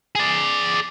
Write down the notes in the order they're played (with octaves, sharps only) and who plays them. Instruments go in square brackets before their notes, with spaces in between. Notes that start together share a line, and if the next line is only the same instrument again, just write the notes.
[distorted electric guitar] G#4 D5